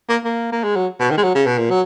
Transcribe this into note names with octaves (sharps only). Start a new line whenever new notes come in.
A#3
A#3
A#3
G#3
F#3
B2
D#3
G#3
F#3
C#3
B2
A#2
F#3